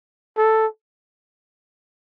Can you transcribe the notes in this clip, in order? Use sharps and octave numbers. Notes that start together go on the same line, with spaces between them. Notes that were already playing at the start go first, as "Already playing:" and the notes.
A4